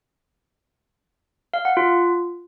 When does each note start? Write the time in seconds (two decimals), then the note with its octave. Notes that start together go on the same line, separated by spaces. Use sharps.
1.54 F5
1.65 F#5
1.77 F4